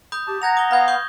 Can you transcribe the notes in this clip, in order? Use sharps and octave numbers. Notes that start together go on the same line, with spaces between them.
B5 D#6 G6
G4 A5
F#5 A#5 G#6 A#6 F7
D#6 G7
B3 F5 B5 G#6
C#6 D#6 G6